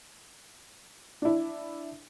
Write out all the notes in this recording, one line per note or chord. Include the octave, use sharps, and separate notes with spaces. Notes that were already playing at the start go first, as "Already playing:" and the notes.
D4 E4